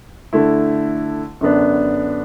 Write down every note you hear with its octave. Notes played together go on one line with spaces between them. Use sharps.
D3 A3 E4
F#2 D3 B3 D4